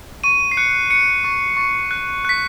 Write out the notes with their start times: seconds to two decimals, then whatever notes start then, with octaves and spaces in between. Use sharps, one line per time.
0.24 C#6 D#7
0.51 C7
0.57 F#6 C#7
0.90 F#6 C#7
1.24 C#6
1.57 C#6
1.91 F#6
2.25 F#6 B6